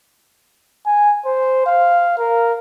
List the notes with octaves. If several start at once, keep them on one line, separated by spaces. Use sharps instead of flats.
G#5
C5
F5
A#4